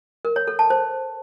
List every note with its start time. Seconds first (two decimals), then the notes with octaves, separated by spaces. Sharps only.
0.25 A#4
0.36 C#5
0.47 A4
0.59 A5
0.70 C5